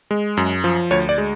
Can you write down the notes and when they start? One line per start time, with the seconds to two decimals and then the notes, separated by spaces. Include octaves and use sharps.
0.11 G#3
0.37 F#2
0.64 F3
0.91 D2 C#5
1.09 D5
1.18 G#3